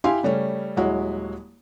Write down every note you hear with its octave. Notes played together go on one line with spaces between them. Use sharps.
E4 G4 F5 G#5 C6
C#3 G3 A3 C#4
D#1 F#3 G#3 E4 F#4